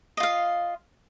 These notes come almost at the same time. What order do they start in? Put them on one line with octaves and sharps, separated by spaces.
D#5 F4 F5